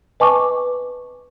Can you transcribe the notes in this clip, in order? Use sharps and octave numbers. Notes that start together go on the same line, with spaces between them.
B4 D#5 G#5 A5 C#6 D6